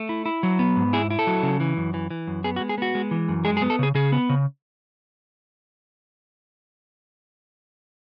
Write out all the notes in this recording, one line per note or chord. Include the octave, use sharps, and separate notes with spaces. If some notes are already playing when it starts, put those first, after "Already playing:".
Already playing: A3
E4
E4
F#3
B3
G#2
E4 G#4
E4
A4
F#3
C#3
E3
F#2
E3
E3
F#2
B3 G#4
F#4
G#3
G#4
B3 F#4
G#3
E3
F#2
G#3 G#4
G#4
B3
A4
C#3 G#4
C#3 G#4
B3
C#3